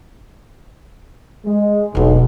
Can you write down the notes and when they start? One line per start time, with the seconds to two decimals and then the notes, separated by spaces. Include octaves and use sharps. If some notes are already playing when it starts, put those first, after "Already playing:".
1.45 G#3
1.95 E1 B1 A#3